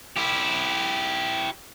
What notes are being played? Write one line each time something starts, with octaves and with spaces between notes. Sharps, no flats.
E4 G4